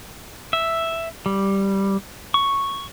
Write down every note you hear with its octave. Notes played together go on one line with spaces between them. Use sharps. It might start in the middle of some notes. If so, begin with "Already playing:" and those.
E5
G3
C#6